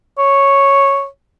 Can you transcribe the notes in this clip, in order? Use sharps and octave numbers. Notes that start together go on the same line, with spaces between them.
C#5